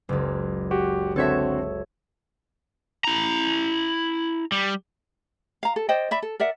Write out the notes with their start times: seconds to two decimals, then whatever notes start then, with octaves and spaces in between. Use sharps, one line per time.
0.09 F#1 C#2
0.71 F#4 G4
1.16 D3 C4 F#4 A4 C#5 E5
3.04 E4 A#5
4.52 G3
5.63 F5 A#5
5.76 A4
5.89 C5 D5 D#5 G5
6.11 D5 E5 B5
6.22 A4
6.40 A#4 D5 E5 F#5